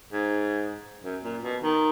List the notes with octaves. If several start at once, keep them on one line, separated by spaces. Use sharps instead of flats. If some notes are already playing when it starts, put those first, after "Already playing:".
G#2
F#2
A#2
B2
D#3